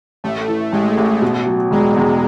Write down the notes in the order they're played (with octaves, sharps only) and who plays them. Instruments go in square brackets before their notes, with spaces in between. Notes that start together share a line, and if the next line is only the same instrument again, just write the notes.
[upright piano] A1 [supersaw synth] A3
[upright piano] E3
[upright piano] A1 [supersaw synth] G#3
[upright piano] A1
B2
F#3
[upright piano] E1 [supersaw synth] G#3
[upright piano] E2